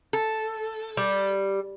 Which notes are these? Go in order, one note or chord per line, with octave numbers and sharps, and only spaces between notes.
A4
G3